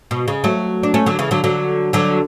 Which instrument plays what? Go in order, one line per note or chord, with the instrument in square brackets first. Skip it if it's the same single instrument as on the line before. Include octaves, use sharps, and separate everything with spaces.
[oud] B2
C#3
F#3 A3
D4
A3 C#4
D3 F#3
C#3 E3
D3 F#3
D3 F#3
D3 F#3